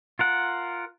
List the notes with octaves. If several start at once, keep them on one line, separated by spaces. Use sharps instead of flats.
F4 A#4 F#5